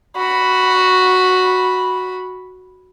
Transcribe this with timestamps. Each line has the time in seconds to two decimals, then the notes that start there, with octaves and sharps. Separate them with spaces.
0.17 F#4 B5